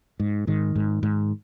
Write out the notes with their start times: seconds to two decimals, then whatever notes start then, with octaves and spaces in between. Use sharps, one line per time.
0.20 G#2
0.47 G#2 D#3
0.76 G#2
1.03 G#2